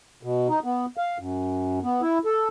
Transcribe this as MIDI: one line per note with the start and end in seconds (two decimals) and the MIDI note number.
0.23 0.48 47
0.49 0.59 63
0.64 0.86 59
0.97 1.18 77
1.19 1.79 42
1.84 2.01 59
2.02 2.19 64
2.25 2.48 69